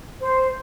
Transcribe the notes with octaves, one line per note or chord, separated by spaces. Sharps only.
C5